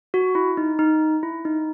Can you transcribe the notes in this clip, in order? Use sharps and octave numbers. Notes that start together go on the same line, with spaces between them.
F#4
E4
D#4
D#4
E4
D#4